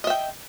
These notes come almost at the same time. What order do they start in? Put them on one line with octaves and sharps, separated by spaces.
D#5 E5 G5